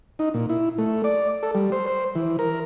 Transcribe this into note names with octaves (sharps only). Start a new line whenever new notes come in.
D#4
A#2
E4
A3
D5
A4
G3
C5
C5
E3
A#4